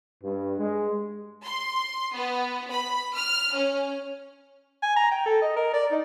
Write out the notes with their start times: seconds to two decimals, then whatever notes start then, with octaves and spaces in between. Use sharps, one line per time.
0.23 G2
0.59 G#3
1.44 C6
2.14 B3
2.71 B5
3.15 F6
3.55 C#4
4.82 G#5
4.96 A#5
5.11 G5
5.26 A4
5.42 D#5
5.56 A#4
5.74 D5
5.91 D#4